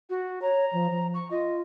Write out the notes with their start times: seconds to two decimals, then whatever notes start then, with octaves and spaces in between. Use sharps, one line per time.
0.10 F#4
0.42 C#5 A#5
0.73 F3
0.91 F3
1.14 C#6
1.31 F4 D#5